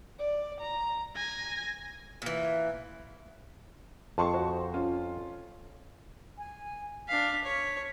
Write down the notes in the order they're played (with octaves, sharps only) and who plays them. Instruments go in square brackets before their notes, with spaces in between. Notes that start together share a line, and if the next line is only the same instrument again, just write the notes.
[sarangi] D5
A#5
[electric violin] G#5 A#6
[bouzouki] A#2 E3
[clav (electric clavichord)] F2 [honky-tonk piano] A5 C6 C#6
[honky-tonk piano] F#4 C5
C#4 F4
[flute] G#5
[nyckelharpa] D4 F5 [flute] B6
[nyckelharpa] C#5 [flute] B6